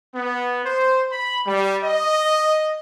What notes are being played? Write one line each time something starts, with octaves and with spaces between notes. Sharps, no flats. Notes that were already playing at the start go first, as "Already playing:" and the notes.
B3
C5
B5
G3
D#5